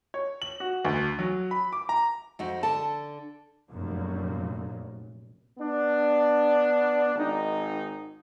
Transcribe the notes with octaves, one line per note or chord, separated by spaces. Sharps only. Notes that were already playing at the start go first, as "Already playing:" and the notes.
C#5
F#7
F#4
D2
F#3
B5
D6
A#5
F2 D#4 F#4
D3 A4 A5
F1 A#1 F#2 A#2
B3 D4
G#1 D#4